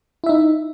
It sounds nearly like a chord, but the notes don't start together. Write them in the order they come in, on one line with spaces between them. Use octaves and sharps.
E4 E5 D#4